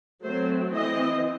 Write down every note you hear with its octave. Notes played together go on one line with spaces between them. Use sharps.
F#3 A3 C4 C5
E3 C4 D#5